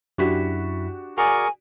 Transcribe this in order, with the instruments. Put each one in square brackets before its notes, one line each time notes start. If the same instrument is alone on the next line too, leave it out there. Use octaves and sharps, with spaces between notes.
[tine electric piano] F#2 E4 B6 [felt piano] D4 F#4 G4
[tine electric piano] F#4 D5 [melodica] G#4 A#4 C#6 [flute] G#5